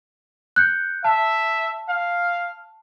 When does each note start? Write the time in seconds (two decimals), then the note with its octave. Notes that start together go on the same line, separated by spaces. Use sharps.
0.56 F#6 G6 C#7
1.04 E5 A5
1.89 F5